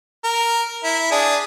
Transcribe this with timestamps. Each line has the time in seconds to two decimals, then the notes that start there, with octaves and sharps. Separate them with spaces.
0.24 A#4
0.84 E4
1.11 D4 G#4